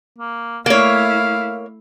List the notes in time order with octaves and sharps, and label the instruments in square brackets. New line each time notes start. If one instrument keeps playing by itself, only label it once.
[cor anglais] A#3
[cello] A3 E4 [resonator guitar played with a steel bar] A#3 C#5 [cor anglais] F5